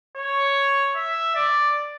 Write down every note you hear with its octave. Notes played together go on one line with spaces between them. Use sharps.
C#5
E5
D5